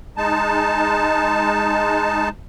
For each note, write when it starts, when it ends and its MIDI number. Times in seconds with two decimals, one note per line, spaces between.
0.17 2.29 56
0.17 2.29 63
0.17 2.29 81